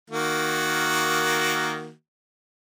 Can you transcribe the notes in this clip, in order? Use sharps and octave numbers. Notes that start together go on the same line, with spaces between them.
D#3 A#3 F#4